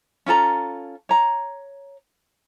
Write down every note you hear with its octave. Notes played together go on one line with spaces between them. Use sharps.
C#4 F4 A4 A#5
C#5 A#5